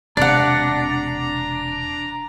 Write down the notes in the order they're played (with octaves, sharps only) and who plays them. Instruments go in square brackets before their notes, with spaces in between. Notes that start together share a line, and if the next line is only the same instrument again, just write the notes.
[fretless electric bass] E1 C3 [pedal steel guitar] D4 [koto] D5 F#5 [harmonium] A#5